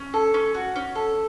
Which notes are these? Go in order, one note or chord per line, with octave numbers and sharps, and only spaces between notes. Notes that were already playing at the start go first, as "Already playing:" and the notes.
Already playing: C#4
A4
C#4
F#4
C#4
A4